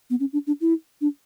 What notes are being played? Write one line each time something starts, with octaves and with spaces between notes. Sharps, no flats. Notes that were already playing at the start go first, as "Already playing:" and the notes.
B3
C#4
D4
D4
E4
D4